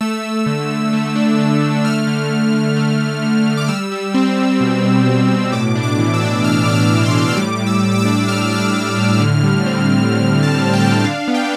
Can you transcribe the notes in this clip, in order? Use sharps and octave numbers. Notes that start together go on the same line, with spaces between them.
A3 E6
A3
D3
D3
A3
D4
D3
D3
A3 F6
D3
D3
D3
A3
D3
D3
A3
D6
G3 E6
G3
C4
G3
B2
B2
B2
B2
A2 D6
D4
D6
E3
E6
D4
D4 F6
D4 D6
E6
E3
C6
A2
E6
G3 D6
A2
E6
G3
D6
E6
D4
D4 F6
D4 F6
A2
A2
D3
G3
C4
D3
D3
D3
A5
C4
G5
D3 A5
G5
D4 F5
B3
G5